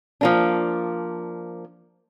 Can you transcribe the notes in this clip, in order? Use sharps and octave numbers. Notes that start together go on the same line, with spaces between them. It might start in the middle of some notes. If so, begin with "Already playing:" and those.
F3 A#3 D4